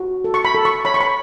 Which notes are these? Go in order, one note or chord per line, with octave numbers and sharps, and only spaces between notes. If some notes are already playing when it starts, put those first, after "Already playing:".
Already playing: F#4
A4
C#6
B5
A4
C#6
C#5 B5
C#6
B5